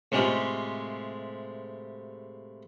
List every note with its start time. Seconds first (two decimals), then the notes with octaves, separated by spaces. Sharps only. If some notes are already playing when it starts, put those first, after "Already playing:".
0.12 A2 C3 G#3 F4 G4